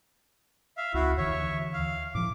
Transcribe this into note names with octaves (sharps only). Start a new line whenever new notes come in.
E5 F5
C#2 E4 F#4
D#2 D3 E3 C#5 E5
F5
A2 F3 D6